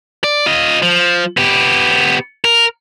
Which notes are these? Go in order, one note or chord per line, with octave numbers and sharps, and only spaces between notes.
D5
F4 D#5
F3
B3 G4
A#4